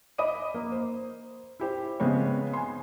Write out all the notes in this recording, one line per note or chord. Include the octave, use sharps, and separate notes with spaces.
D#5 B5 D6 D#6 D#7
A#3
C5
E4 G4 C5
C#3 G#3 B3 C4 C#5
G#5 C6